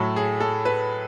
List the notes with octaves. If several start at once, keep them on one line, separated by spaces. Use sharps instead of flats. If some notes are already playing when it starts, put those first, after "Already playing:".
Already playing: A2 F#3 A3 A4
G#4
A4
B4